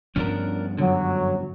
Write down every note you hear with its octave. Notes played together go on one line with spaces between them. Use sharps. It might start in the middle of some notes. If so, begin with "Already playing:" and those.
G2 F3 B3 C#4 D4 A#4
F#2 D3 F#3